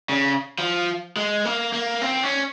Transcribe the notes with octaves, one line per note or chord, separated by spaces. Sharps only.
C#3
F3
G#3
A#3
A#3
C4
C#4